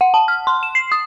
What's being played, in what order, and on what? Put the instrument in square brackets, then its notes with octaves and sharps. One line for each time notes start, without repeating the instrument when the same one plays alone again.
[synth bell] F#5
A5
F6
C6
E7
C7
D#6